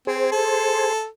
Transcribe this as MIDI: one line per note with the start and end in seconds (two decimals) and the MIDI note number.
0.07 0.29 60
0.07 0.93 68
0.07 0.93 72
0.32 1.06 69